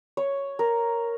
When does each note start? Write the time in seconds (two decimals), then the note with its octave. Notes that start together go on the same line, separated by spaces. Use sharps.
0.17 C#5
0.59 A#4